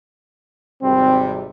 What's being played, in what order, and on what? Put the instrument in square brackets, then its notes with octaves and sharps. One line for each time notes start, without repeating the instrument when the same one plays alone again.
[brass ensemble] G#1 C3 G3 [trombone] C4